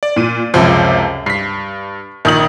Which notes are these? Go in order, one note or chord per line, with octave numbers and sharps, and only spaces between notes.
D5
A#2 D#7
C#2 F#2 C3 F3
G2 B6 C7
A#1 D#3 D#6 F#7